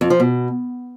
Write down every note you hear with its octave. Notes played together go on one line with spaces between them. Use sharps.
F2
F3
B2